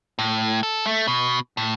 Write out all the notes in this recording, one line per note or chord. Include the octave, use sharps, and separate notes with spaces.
A2
A4
A3
B2
A2